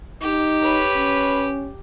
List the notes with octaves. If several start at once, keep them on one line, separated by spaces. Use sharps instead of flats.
D#4 G4
B4 C#5 B5
C#4